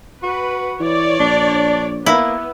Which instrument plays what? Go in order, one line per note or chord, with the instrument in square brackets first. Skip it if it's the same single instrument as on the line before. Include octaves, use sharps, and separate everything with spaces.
[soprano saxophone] F#4 [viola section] B4
[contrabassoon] E3 [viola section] C#5 D5
[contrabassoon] A#1 [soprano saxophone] D4
[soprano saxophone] A#3 [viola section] B3 [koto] E4